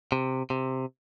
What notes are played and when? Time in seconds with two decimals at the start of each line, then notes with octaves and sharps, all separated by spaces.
0.12 C3
0.50 C3